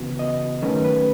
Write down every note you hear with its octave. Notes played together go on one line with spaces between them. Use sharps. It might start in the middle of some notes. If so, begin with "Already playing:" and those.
Already playing: C#3 E3 B3 F#4
D#5
D#3 F#3 A3 C#4 B4
B4